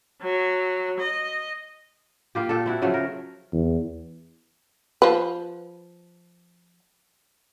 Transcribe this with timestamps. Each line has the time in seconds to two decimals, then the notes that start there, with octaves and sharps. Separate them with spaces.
0.22 F#3
1.00 D#5
2.35 A#3 F4 G4
2.49 A#2 A4
2.66 C4 E4 F#4
2.82 C#3 F3 F#3 A3
2.94 A#4
3.53 E2
5.02 F3 B4